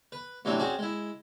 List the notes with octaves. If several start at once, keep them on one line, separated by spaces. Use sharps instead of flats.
B4
A2 C3 E3 F#3 C4 D4
C4 C#4 F#4 G#4 D5
G#3 E4